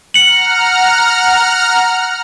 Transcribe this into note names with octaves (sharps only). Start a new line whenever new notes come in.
F#5 A#5 F6 C#7 F#7